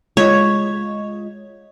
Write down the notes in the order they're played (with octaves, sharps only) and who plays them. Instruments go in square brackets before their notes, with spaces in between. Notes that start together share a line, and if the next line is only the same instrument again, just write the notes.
[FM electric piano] G#3 F4 D#5 [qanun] C#5